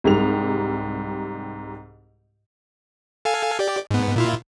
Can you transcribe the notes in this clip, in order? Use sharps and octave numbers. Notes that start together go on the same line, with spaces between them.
C2 G#2 G3 F7
A4 F5 G#5
G4 D5
G#2 B3
A#2 E4 F4